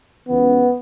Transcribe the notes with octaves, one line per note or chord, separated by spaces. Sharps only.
C#2 C#3 E3 B3